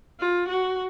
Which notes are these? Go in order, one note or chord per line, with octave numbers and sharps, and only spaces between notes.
F4
F#4